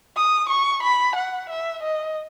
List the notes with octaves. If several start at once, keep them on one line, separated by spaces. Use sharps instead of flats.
D#6
C#6
B5
F#5
E5
D#5